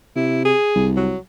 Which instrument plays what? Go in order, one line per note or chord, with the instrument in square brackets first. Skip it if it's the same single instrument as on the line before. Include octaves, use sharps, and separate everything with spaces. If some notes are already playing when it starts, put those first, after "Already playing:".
[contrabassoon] C3 [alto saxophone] E4
[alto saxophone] G#4
[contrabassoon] C2
[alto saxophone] F#3